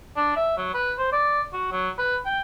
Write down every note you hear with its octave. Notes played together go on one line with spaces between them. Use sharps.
D4
E5
F#3
B4
C5
D5
F#4
F#3
B4
G5